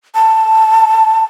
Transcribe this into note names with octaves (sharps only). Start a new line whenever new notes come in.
A5